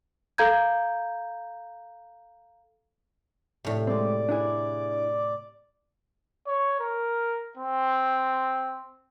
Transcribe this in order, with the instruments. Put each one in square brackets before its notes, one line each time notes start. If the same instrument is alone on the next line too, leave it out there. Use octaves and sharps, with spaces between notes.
[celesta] A4 F5 A#5 G6 G#6
[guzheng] A2 C3
[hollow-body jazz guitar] G#3 C4 [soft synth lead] D5
[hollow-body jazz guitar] D4 E4 G#4
[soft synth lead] D5
[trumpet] C#5
A#4
C4